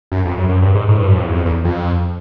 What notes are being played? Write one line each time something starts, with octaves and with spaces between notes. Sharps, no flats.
F#2
F2
F#2
F#2
G2
G#2
A2
G2
F#2
F2
E2
F2
E2
F2